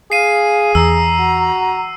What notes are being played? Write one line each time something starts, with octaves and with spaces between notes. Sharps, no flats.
G#4 F5 C7 D#7
E2 A#5 E6
F#4